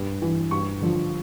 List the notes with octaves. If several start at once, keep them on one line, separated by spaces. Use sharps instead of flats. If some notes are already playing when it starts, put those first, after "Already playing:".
Already playing: G2
E3
G2 C#6
D3 F3